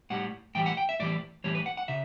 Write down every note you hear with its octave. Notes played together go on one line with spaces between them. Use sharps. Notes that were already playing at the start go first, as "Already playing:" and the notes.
A2 G3 F#5
A2 E3 G3 G5
F#5
G5
E5
A2 E3 G3 D5
A2 E3 G3 C#5
B4
F#5
F#5
C#3 E5